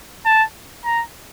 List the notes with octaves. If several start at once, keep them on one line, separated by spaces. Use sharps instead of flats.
A5
A#5